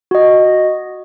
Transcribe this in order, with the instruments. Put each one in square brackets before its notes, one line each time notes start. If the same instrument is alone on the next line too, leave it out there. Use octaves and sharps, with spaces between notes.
[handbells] F#4 D#5